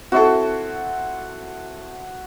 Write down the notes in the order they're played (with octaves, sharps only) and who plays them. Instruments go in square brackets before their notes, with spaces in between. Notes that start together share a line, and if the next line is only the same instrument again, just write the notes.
[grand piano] C4 E4 A4 [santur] F#4